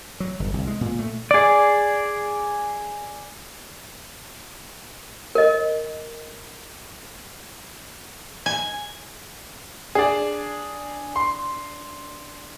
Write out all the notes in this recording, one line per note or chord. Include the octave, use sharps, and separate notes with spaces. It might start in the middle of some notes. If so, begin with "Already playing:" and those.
F#3
G1
C2
G#3
A#2
A3
G#4 D5
A#4 D#5
G#5
D4 G#4 D5
C6